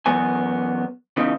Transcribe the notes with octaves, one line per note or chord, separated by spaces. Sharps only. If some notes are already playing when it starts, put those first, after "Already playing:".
F#2 E3 B3 G#5
C#3 E3 B3 D#4